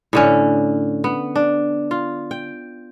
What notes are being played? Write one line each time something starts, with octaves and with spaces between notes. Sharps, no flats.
A2 D3 C#4
B3
D4
F4
G5